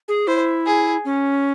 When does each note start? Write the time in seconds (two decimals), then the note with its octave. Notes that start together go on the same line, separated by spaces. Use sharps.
0.08 G#4
0.27 E4 C5
0.66 G#4
1.05 C#4